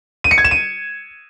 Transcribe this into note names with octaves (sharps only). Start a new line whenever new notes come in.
D#7
C#7
G#6
E7
D#7